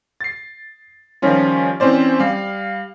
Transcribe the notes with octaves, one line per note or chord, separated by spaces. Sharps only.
A6 C7
D#3 F3 G3 C#4 F4
E3 C4 C#4 C5 D5
G3 F5